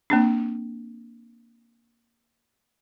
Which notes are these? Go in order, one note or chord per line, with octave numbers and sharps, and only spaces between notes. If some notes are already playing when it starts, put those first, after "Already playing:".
A#3 C4 D4